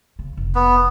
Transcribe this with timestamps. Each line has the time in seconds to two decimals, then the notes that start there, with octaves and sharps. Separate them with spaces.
0.19 C#3
0.37 F1
0.55 B3